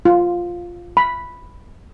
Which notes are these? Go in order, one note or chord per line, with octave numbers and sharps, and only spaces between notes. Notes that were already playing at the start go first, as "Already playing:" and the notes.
F4
B5